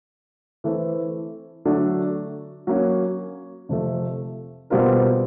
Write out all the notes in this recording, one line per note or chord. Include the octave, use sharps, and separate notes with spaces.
E3 A3 C4
D3 F#3 A3 D4
F#3 A#3 C#4
F2 C3 F3 A3
B2 G3 C4 F4 A#4